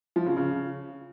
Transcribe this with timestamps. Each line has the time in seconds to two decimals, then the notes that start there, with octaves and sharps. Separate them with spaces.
0.16 F3
0.26 C#3
0.37 C#3